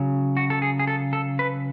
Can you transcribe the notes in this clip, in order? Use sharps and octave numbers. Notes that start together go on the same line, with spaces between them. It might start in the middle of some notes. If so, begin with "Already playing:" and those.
Already playing: C#3 F#3
F#4
A4
G#4
G#4
A4
A4
B4